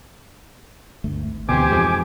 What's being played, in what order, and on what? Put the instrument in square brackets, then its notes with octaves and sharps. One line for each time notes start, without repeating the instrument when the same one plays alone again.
[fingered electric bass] G1 D2 A3
G#1
[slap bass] D2 B2 [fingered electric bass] E3 C4 [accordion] G4 C5 [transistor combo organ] G#5 D6
[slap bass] F2 G#2